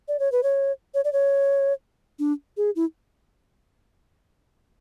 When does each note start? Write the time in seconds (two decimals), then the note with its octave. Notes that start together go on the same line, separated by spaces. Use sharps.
0.08 D5
0.19 C#5
0.32 B4
0.43 C#5
0.94 C#5
1.04 D5
1.13 C#5
2.19 D4
2.57 G#4
2.76 E4